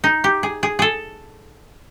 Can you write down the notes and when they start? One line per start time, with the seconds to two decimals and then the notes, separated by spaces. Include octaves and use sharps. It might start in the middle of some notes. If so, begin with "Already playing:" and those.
0.04 D#4
0.24 G4
0.43 G#4
0.63 G#4
0.79 G#4 A4